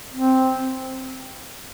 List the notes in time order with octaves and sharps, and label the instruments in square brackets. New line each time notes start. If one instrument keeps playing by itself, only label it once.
[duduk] C4